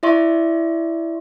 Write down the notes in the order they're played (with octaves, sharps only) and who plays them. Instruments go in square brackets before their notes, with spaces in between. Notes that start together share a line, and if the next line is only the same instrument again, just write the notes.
[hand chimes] E4 D5 E5 C6 C#6